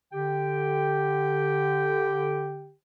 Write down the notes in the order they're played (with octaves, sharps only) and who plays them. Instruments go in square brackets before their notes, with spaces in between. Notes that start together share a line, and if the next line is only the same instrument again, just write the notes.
[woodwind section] D3 G4 G5